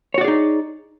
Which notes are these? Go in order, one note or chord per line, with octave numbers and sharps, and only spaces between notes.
D#4 F#4 G#4 C#5 D5